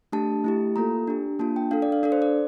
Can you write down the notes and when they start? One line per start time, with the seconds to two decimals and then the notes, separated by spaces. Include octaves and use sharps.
0.12 A3 D4 G4 A5
0.44 A3 E4 G4
0.76 A#3 F4 A4 A#5
1.07 D4 G4
1.39 A#3 D4 F4 A5
1.56 G5
1.71 D4 A4 F5
1.82 D5
1.92 F5
2.03 D4 A4 D5
2.12 C5
2.22 D5